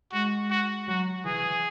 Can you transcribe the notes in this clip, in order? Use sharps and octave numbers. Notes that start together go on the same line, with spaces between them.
G#3 F#4
F#4
F#3 F#4
E3 G#4